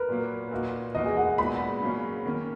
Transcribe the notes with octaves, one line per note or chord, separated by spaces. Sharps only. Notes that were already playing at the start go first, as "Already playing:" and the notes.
Already playing: A#4 B4
A#2 F#3 A#3
A#2 A#3 D#4 F#4
E3 A#3 D#4 F#4 D#5
G#4
F#5
A#2 G#3 B3 D#4 F#4 B5
C#3 F#3 A#3 C#4
D#3 A#3 C#4